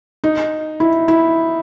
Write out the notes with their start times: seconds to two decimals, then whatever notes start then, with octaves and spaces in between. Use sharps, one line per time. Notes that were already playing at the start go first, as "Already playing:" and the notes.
0.24 D#4
0.80 E4
1.08 E4